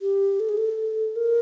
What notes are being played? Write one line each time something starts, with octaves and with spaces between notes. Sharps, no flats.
G4
A4
G#4
A4
A#4